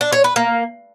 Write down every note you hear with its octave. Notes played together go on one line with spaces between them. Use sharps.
D4
C#5
B4
A#3